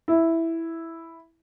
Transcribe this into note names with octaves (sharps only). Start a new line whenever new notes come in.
E4